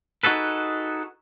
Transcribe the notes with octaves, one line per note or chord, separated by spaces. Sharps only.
D#4 F#4 G#4 A4 B4